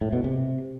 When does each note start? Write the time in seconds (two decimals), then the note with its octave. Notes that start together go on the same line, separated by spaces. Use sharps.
0.01 A2
0.13 B2
0.24 C3